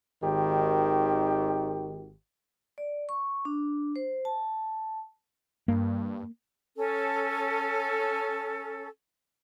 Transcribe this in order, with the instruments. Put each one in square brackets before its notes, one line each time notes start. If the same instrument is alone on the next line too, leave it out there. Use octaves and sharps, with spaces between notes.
[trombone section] G#1 D#3 G4
[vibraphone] D5
C#6
D4
C5
A5
[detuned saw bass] G2 [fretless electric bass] A#3
[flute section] C#4 A4